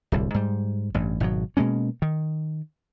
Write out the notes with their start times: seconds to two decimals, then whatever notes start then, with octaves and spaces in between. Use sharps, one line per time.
0.12 D1 C2
0.34 G#2 G3
0.94 A1 G2
1.20 G#1 B2 D3 F#3
1.57 B2 G#3 A#3 C#4
2.02 D#3